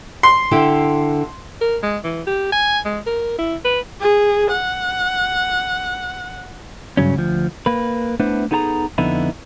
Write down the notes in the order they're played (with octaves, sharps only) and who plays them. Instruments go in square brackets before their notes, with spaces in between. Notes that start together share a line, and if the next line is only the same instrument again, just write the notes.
[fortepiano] C6
[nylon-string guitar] D3 E4 G4
[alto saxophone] A#4
G#3
E3
G4
G#5
G#3
A#4
E4
B4
[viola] G#4
F#5
[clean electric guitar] G2 C#3 F#3 C#4
D2 F3
A#3 B4
A3 B3 D4 E4 B4 C5
B3 D#4 G#4 A4 A5 A#5
F2 D3 B3 D#4 E4